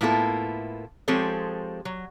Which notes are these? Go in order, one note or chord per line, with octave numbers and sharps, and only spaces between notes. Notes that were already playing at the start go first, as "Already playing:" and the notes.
A2 A#3 B3 E4 F4 A4
F3 G#3 C4 G4 A4 C#5
F#3